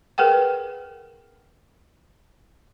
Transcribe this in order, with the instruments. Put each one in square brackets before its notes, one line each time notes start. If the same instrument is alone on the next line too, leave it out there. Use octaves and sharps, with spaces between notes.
[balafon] G#4 A#4 B4 F#5 G5